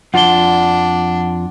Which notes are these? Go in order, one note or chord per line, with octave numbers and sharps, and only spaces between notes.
F2 D4 F4 D5 F#5 G7